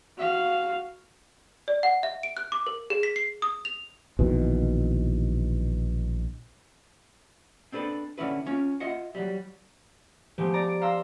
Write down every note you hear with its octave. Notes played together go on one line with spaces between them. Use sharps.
F#4 F5
D5
F#5
E5
D7
F#6
D6
A#4
G#4
B6
C7
D#6
F7
A#1 B2 D#3 E3
C4 D4 A4 B4
D3 C#4 E4 B4
C#4 F4
F4 D#5 E5 F#5
F#3 G3
F3 G#3 A3 B3 G4
D5 A#5 A6 D7
D7
F5 A#5 C6 E6